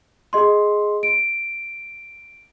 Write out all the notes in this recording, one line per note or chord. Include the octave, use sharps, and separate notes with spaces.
G#4 D#5 C6
D7